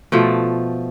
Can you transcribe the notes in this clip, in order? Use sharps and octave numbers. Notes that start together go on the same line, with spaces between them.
B2 F3 A3